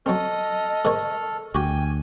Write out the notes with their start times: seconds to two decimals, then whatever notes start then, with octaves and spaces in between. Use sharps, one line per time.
0.06 F#3 C4 A4 D#5 F6
0.85 G#2 D#3 C#5
1.55 D2 F#4 G4 G5 G#5